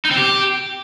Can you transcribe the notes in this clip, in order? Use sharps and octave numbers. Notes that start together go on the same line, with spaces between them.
D#4
C4
G4